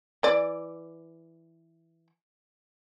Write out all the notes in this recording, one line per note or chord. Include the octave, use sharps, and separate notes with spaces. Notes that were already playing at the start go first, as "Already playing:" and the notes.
E3 D5